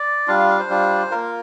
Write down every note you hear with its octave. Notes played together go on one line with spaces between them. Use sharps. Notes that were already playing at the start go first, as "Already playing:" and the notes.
Already playing: D5
G3 D4 F4 F5
F5
F5
C5
G3 D4 F4
A#3 F4 A#4